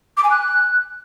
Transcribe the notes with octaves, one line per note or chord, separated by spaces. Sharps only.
D6
G#5
F#6